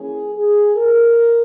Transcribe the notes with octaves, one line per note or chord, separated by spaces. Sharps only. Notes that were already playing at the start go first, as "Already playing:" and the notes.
Already playing: E3 A#3 C#4 G#4
G#4
A#4